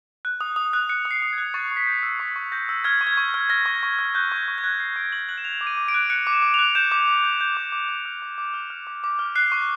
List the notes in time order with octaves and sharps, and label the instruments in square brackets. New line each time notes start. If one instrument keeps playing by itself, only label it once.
[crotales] F#6
D#6
D#6
F#6
F#6 C#7
D#6
C7
D#6
G#6
F#6
C#6 A6
C#6
B6
G6
E6 C7
C#6 B6
C#6
G6 A#6
E6
F6 G#6
C#6
G#6
C#6
F6
F6 A#6
C#6
C#6
F6
F#6 G6
C#6 G6
C#6
G#6
F#6
F#6 C7
C#6 D7
C#6 F#7
F#6 F#7
E7
F#6 F7
D6
D#7
D6
D7
F#6
F#6 C#7
D6
E7
D6
F#6 F7
G6 E7
D6
D6
G6
G6
D6
D6
G6
F6
D6
D6
F6
F6
D6
D6
F6
F#6 C7
C#6